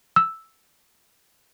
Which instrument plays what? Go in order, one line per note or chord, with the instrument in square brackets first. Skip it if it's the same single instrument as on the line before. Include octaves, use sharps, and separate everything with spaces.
[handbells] E6